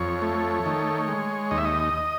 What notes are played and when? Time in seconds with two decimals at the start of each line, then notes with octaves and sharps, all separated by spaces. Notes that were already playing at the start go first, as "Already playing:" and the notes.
Already playing: F2 C#5
0.22 A3
0.66 D#3
1.08 G#3
1.51 D#2 D#5
1.58 E5
1.65 D#5